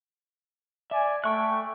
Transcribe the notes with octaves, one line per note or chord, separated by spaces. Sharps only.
D5 E5 G#5
A3 G5 C#6 F#6